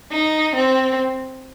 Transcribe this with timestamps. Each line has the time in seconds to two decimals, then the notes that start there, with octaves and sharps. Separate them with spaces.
0.11 D#4
0.56 C4